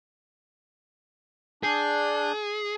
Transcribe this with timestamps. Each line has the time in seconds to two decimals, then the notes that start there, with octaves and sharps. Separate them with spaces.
1.63 D4 G#4 G6